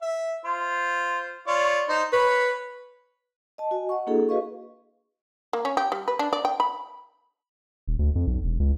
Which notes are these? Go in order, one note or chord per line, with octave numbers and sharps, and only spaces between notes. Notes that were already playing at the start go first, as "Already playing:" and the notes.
E5
F4 C5
F4 C#5 D5
D#4 C5
B4 C#5 B5
D#5 A5
F#4 D#5 G#5
D#5 F#5 C#6
A#3 D4 E4 F#4 G#4 A4
F#4 G#4 B4 D#5 F5 C#6
A#3
C#4
G4
G3
B4
D4
D5
G5
B5
D#1
D2
F2
B1
E1
C#2